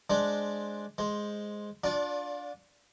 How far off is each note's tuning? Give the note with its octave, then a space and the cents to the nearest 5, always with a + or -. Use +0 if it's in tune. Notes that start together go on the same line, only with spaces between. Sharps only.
G#3 +5 D4 +0 C5 +0
G#3 +0 C5 +0
D4 -5 F4 +30 D5 -25